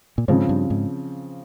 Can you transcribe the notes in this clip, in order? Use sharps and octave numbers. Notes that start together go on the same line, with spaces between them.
A#2
G#2 C#3 F3 C4
G2
G#2